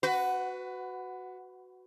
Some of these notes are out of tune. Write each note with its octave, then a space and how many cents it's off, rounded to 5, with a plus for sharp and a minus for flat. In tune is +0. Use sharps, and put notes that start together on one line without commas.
F#4 +0 B4 +20